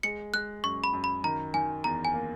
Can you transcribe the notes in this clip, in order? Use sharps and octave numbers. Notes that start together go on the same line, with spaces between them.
G#3 C#7
G#3 F#6
F#2 C#6
B5
F#2
B5
D#3 A#5
D#3 G#5
E2 A#5
G#5
A#3